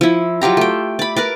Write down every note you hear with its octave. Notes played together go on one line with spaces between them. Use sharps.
F3 E4
F#3 F4 G4 A#5
A3 G5
D5 B5
A#4 B4 D5